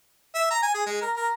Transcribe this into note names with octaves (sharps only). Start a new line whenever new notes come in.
E5
A#5
G#5
G#4
G#3
A#4
A#4